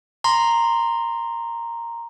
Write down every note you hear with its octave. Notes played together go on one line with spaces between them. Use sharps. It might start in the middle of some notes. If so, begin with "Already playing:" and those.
A#5 C6